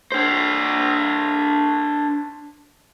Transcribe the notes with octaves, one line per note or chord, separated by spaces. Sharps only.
D4 C5